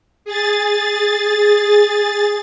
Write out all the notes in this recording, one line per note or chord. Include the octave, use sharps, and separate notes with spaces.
G#4 A6